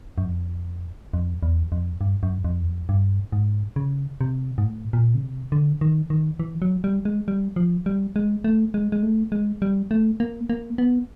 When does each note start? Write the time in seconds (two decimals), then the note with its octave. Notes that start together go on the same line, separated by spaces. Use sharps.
0.18 F#2
0.25 F2
1.14 F2
1.43 E2
1.72 F2
2.01 G2
2.23 F#2
2.44 F2
2.62 E2
2.67 F2
2.89 G2
3.32 G#2
3.76 C#3
4.21 C3
4.58 G#2
4.64 A2
4.93 A#2
5.15 C#3
5.22 C3
5.52 D3
5.81 D#3
6.10 D#3
6.40 E3
6.62 F#3
6.84 G3
7.05 G#3
7.28 G3
7.56 F3
7.86 G3
8.16 G#3
8.44 A3
8.74 G#3
8.92 G#3
9.03 A3
9.32 G#3
9.62 G3
9.91 A3
10.20 A#3
10.50 A#3
10.78 B3